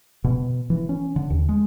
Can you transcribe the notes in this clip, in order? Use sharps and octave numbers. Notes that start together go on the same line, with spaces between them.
B2
E3
C#4
D3
D#2
G#3